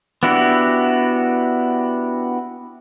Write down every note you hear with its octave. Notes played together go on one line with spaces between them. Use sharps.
B3 D4 E4 F#4 G4